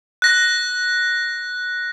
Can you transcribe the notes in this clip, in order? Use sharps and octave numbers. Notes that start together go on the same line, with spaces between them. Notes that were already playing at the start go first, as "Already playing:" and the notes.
F#6 A#6